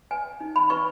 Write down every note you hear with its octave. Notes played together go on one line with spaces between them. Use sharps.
B4 G#5
D#4
B5
B4 C#6